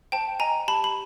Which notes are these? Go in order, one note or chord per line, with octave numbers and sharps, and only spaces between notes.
C5 G5 A5
D#5 G#5 A#5
G4 A5 B5
B5